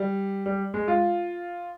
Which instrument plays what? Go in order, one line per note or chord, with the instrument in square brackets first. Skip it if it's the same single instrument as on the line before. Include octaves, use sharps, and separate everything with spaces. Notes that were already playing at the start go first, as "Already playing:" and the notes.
Already playing: [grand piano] G3
G3
G#3
F4